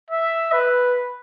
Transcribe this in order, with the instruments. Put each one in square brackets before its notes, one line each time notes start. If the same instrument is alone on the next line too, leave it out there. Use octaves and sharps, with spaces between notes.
[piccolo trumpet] E5
B4